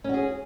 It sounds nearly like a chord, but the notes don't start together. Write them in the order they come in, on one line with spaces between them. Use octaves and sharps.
C#4 F#4 G#4